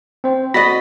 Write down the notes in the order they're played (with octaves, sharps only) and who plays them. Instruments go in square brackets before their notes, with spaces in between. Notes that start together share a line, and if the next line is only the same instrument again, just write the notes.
[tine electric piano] C4 C5
[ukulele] F#4 D5 D#5 [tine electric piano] B5 A#6 B6